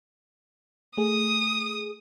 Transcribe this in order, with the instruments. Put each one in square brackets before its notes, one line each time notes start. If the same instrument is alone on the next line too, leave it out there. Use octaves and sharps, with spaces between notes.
[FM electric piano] A3 G#4 [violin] D#6